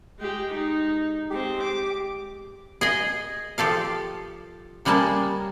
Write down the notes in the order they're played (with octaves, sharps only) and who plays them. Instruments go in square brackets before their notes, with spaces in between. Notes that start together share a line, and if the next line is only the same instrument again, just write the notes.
[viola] G#3 G4
D#4
[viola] G#3 C4 [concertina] G4
[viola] D6
[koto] G#4 D#5 G#5
F3 G4 A4 F5
C#3 G3 G#3 A#3 A5